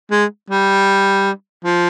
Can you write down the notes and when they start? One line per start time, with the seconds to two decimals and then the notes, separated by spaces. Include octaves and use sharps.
0.11 G#3
0.50 G3
1.64 F3